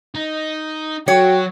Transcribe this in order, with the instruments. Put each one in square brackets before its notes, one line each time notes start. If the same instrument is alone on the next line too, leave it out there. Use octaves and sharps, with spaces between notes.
[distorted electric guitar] D#4
[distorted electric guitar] F#3 [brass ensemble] F#4 [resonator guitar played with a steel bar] C#5 [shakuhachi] G5